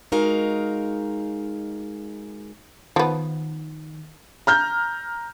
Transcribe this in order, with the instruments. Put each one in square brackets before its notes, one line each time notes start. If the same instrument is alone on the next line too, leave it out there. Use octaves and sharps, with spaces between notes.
[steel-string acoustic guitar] G#3 D#4 F#4 A#4 F5
[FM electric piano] D#3 [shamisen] F3 B3
[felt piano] A#5 F6 G6